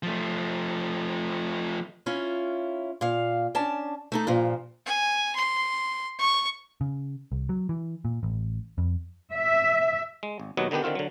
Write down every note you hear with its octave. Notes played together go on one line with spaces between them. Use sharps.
F3 A3
C#4 E4 F4
A#2 F5
C#4 D4 A5
A3 D#4 A4
G2 A#2 F3
G#5
C6
C#6
C#3
C2
F#3
E3
A#2
A1
F2
E5
G#3
G#1
D#2 B2 F#3 B4 D#5
D3 D#3 B3 D4 G4
D3 D#3 C4 F4 F#4
D3 F#3